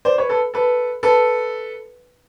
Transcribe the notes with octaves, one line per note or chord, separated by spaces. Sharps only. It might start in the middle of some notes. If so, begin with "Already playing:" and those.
C5 D5
B4 C#5
A4 B4
A4 B4
A4 B4